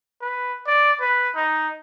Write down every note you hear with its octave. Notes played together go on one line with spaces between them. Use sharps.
B4
D5
B4
D#4